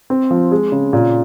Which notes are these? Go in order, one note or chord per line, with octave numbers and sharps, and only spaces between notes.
C4
F3
G#3
C#3
A#2